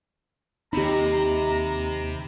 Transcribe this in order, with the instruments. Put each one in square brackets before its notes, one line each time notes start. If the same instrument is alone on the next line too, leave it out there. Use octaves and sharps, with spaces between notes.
[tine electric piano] D#2 B5 [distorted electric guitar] C3 [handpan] D#4 G4 [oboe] A#5